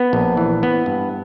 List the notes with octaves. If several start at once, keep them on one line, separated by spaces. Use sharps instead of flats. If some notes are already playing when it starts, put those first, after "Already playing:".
Already playing: B3
A#1
E3
B3
G2